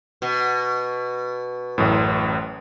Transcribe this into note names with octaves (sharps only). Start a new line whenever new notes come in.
B2
A1 F#2 A2